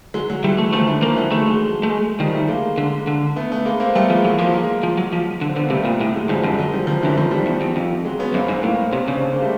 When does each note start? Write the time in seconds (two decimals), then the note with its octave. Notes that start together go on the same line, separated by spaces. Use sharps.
0.14 F#3 G#3
0.29 F#3 G#3
0.43 E3 F#3 G3
0.58 A3
0.73 D#3 F3 A3
0.87 D3 E3
1.02 D#3 F3 A#3
1.16 E3 F#3
1.32 F#3 G#3 A3
1.46 F#3 G#3
1.83 A3
1.90 G#3
2.19 D#3 F3 G3
2.33 G3 A3
2.48 G#3 A#3
2.78 D3
3.07 D3
3.36 A3 B3
3.52 A3 B3
3.65 G#3 A#3
3.80 A#3 C4
3.95 G3 A3 B3
4.09 F3 G#3 A#3
4.24 F#3 G#3 A#3
4.33 E3
4.38 F3 G#3 A#3
4.53 G#3 A#3
4.83 F3
4.97 F#3
5.13 F3
5.41 D3
5.49 C4
5.56 D3 B3
5.63 A#3
5.70 C3 G3 A3
5.85 A#2
6.00 A2 A3
6.14 F#3 G#3
6.29 G#2 F3 G3
6.43 F#2 F3 G3
6.58 F#3 G#3
6.73 F3 G3
6.87 D#3 F3
7.02 F#2 D3 E3
7.16 F2 D#3 F3
7.31 F3 G3
7.46 E2
7.61 E2
7.76 F2
8.05 F#3 G#3
8.19 B3 C#4
8.34 F#2 A#3 C4
8.48 G#2 A#3 C4
8.63 A2 A#3 C4
8.92 C3 B3 C#4
9.07 C#3 C4 D4
9.22 C4 D4
9.32 G#3 A#3
9.42 G3 A3